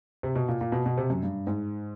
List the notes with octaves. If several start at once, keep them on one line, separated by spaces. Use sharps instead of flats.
C3
B2
A#2
A#2
B2
B2
C3
F#2
G2
G#2